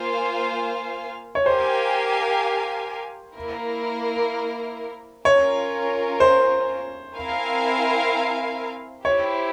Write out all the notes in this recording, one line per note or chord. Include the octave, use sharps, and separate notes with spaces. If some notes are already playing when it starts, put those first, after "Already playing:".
Already playing: A#3 F4 C5 F5 G#5
C#5
G4 A#4 C5 F5 G#5
A#3 E4 A#4
C#4 F4 A#4 C#5
C5
C4 E4 A#4 F5 G#5
E4 G4 C5 C#5